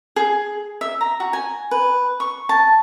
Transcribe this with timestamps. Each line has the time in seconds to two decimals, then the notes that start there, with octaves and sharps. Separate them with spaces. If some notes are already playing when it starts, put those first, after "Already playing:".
0.16 G#4
0.81 E5
1.01 A#5
1.20 F#4
1.33 G#5
1.71 B4
2.20 C#6
2.49 A5